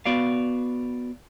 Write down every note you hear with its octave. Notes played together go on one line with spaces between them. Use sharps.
B3 F#4 D5 F5